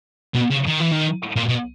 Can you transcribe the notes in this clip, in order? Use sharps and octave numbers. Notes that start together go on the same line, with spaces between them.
B2
C#3
D#3
E3
D#3
A#2
B2